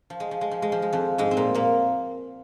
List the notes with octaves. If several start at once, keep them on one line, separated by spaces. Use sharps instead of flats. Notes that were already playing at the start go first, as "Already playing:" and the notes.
F3
G#3
F3
G#3
F3
G#3
F3
G#3
F2 F3
G#2 G#3
C4
A#2 A#3
A#2 A#3